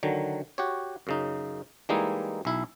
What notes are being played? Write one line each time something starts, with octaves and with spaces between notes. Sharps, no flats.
D3 D#3 F#3
F#4 G4 C#5
F#2 C#3 D#4
E3 G3 G#3 A#3 D#4 E4
B1 E4 E5